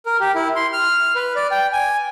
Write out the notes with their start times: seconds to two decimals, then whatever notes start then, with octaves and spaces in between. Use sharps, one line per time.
0.06 A#4
0.20 G4
0.35 E4
0.56 C6
0.73 F6
1.15 B4
1.36 D5
1.51 G5
1.73 G#5